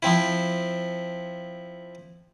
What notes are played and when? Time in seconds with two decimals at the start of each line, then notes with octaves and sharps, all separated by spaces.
0.03 F3 C4 E4